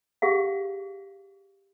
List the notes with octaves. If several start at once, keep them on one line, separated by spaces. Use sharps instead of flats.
G4 G#4 F5 F#5